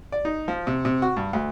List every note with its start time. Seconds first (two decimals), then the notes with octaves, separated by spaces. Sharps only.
0.12 D5
0.25 D#4
0.48 F3
0.67 C3
0.85 C3
1.02 F#4
1.17 G2
1.33 D2